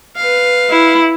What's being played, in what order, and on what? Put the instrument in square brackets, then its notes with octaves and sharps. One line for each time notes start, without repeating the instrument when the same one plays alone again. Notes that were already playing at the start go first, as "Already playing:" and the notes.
[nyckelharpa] B4 F5
[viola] E4